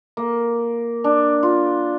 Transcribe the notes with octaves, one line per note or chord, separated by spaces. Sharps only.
A#3
D4
F4